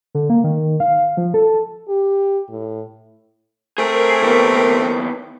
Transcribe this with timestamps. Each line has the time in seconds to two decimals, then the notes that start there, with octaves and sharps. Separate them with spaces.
0.14 D3
0.30 A#3
0.44 D#3
0.80 F5
1.17 F3
1.34 A4
1.89 G4
2.50 A2
3.78 A3 C4 G#4 A#4
4.22 D#2 B3